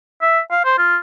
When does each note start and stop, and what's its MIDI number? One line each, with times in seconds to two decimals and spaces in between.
0.22 0.40 76
0.51 0.61 77
0.65 0.74 72
0.78 0.97 65